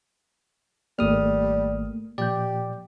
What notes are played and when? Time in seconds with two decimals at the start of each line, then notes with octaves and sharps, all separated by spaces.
0.99 G#1 G3 A3 A#3 D#6 F6
2.18 A#2 F3 G4 D5 G6